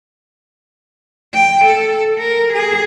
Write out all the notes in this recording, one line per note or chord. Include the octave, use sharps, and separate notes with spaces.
G5
A4
A#4
G#4